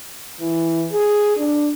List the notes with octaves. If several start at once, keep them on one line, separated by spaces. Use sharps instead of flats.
E3
G#4
D4